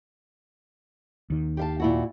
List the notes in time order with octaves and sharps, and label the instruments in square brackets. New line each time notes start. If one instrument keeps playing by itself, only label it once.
[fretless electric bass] D#2 D#3
[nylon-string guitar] G4 F5 A5
A#2 E4 F#4